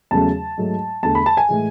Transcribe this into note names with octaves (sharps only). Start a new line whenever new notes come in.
E2 C#3 F#3 A3 A5
G#2 F#3 A3
E2 D3 A3 A5
B5
A5
G#5
A2 E3 G#3